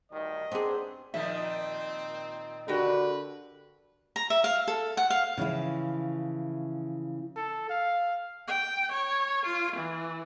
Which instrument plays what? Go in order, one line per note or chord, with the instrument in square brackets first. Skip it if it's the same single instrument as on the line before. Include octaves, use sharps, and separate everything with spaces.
[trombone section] D2 G2 D#3 [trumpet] D#5
[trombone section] G#2 C4 D4 [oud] B3 G#4
[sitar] A#2 D#3 F3 [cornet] C4 [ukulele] E5
[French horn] D3 [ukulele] F#4 G4 A#4 [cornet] B4
[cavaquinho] A#5
E5
F5
A4
F#5
F5
[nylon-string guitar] C#3 E3 F3 E4
[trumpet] A4
F5
[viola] G5
C#5
F4
E3